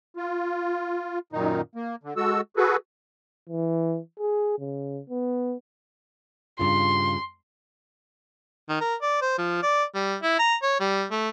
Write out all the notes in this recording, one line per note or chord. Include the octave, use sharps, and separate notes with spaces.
F4
F#2 A#2 D#3 D#4
A#3
D3
G#3 F#4 A4 E6
F#4 G#4 A4 B4
E3
G#4
C#3
B3
G2 C#3 F4 C6
D#3
A#4
D5
C5
F3
D5
G3
E4
A#5
C#5
G3
A3